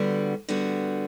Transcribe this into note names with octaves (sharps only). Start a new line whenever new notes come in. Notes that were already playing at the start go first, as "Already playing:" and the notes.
Already playing: D3 G3 B3 F#4
D3 G3 B3 F#4